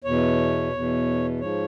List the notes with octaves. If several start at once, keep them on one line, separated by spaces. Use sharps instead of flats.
E2 B2 C#5
E2 B2
G#2 F3 C#5